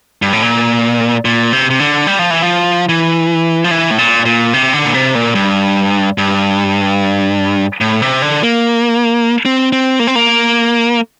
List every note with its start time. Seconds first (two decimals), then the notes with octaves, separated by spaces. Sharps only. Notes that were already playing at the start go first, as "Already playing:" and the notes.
0.22 G2
0.33 A2
0.42 A#2
1.25 A#2
1.53 C3
1.70 C3
1.80 D3
2.07 G3
2.19 F3
2.30 E3
2.42 F3
2.89 E3
3.64 F3
3.71 E3
3.91 A2
3.98 A#2
4.25 A#2
4.53 C3
4.73 D3
4.85 A#2
4.94 C3
5.15 A#2
5.35 G2
6.18 G2
7.81 A2
8.02 C3
8.22 D3
8.43 A#3
9.45 C4
9.72 C4
9.99 A#3
10.07 C4
10.16 A#3